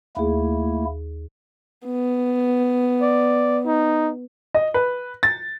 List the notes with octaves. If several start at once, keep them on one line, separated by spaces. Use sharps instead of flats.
D#2 A3 A#3 E4 G#4
B3
D5
D#4
D#5
B4
A6